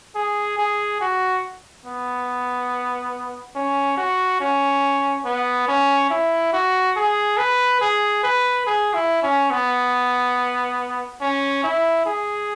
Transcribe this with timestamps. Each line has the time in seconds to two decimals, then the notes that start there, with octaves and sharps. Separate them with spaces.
0.15 G#4
0.58 G#4
1.01 F#4
1.86 B3
3.55 C#4
3.98 F#4
4.41 C#4
5.25 B3
5.68 C#4
6.10 E4
6.53 F#4
6.96 G#4
7.38 B4
7.81 G#4
8.24 B4
8.66 G#4
8.94 E4
9.23 C#4
9.51 B3
11.21 C#4
11.64 E4
12.06 G#4